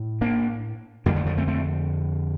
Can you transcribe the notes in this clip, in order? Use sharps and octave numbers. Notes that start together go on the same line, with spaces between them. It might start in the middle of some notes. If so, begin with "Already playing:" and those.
Already playing: A2
A#3 D4
F2 D3 G3 A#3
F3 A3
F3 A3
A3 C4
A3 C4